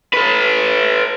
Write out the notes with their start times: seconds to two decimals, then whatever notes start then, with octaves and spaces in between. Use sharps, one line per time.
0.13 A4 B4